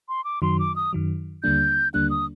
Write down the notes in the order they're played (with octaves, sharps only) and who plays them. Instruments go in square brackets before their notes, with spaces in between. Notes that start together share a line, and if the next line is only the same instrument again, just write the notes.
[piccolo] C6
D6
[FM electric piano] F#2 D#3 F#3 [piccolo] C6
[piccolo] D6
D#6
[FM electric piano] F#2 D#3 F#3
[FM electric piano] D#2 D3 G3 A#3 D4 [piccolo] G6
[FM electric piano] D#2 D3 G3 A#3 D4 [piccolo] F#6
[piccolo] D#6